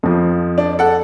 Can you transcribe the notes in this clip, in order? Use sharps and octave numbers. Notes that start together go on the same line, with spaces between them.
F2 F3
D4
A4 F#5